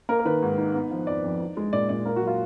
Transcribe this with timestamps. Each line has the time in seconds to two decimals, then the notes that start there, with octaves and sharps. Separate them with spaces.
0.09 A#3 A#4
0.19 A#4
0.25 D#3 B4
0.42 G#2
0.58 D#4
0.74 B3
0.90 F3
1.07 F2 D5
1.24 F2
1.40 D#4
1.57 G#3
1.73 A#2 D5
1.89 A#2 D5
2.05 A#3 A#4
2.16 F#4
2.22 F#3
2.27 F4